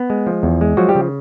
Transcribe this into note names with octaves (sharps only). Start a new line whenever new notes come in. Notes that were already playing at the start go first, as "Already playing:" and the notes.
Already playing: B3
G#3
F3
E2
G#3
F3 F#3 F#4
G3 G4
C#3